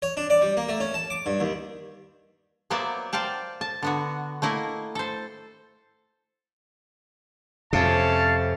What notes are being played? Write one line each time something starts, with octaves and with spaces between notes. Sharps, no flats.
C#5
D4
D5
G3
A#3
A3
C#4
A5
D6
G2
D#2
F#3 A#3 B3 C5 D5 E5
C5 D5 F5 G5 A5
A5
D3 B3 F#4
A3 A#3 E4 D#5
A4 C5
F2 C3 C#4 F5 A5